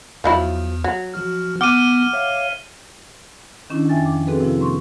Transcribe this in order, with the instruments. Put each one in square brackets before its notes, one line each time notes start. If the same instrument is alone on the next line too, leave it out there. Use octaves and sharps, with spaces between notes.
[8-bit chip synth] E2 [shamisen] F3 F#3 E4
[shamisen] F#3
[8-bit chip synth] F3 F#4 F6
[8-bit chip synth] B3 [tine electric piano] F#5 D6 [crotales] F6 D#7
[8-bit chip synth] C#5 E5 F5
[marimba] D#3 C#4 D4 E4
F2 E5 G5 G#5 A6
F3 D6
C4 F#4 G#4 A4 B4
C3 F3 E4
A#3 C6 C#6